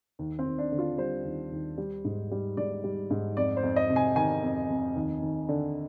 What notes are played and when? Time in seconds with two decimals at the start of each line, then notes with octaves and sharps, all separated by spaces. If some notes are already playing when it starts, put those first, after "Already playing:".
0.19 D#2
0.39 C4
0.45 D#2
0.58 D4
0.72 D3
0.79 F4
0.98 G3 C5
1.25 D#2
1.52 D#2
1.78 G3
2.05 G#2
2.31 G3
2.57 G#2 D5
2.84 G3
3.10 G#2
3.37 F2 D5
3.57 C5
3.63 F2
3.76 D#5
3.90 C3
3.96 G#5
4.16 D#3 G#5
4.43 F2
4.70 F2
4.96 D#2
5.22 D#2
5.49 D3